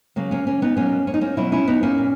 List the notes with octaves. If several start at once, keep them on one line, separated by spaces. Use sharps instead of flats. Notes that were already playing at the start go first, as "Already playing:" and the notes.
C#3 F#3 A#3
A#3 C#4
A#3 C#4
B3 D#4
B2 F#3 A#3 C#4
C#4
D#4
A#3 C#4
B2 F#3 C#4 E4
C#4 E4
B3 D#4
A#3 C#4
A#2